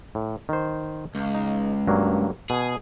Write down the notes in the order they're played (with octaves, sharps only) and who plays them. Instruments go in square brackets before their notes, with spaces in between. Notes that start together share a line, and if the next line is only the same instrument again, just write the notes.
[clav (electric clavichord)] A2
D#3 C5
[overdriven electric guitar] C#2
[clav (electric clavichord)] D#4
G2 F#3 A#3
[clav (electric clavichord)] B2 [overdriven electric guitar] G#4